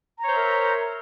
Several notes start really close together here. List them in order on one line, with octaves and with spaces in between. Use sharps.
A#5 C#5 C5 E5 A#4